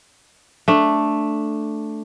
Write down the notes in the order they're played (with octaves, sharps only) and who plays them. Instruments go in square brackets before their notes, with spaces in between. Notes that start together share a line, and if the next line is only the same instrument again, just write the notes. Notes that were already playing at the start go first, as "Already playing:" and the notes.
[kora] A3 D4